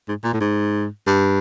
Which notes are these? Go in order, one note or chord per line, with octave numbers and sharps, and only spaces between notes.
G#2
A#2
A2
G#2
G2